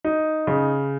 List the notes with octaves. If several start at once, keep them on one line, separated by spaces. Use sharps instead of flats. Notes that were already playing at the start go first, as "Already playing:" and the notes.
D#4
C#3